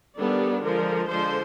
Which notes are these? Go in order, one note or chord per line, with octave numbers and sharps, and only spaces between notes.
D#3 G3 B3 D4 A4
D3 F3 G#3 A#4
D3 F3 G#3 C5